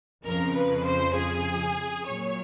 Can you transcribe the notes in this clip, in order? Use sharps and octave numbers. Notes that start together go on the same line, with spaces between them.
F2 C#3 F3 A#4
B4
C5
G#4
A#2 F#3 C#5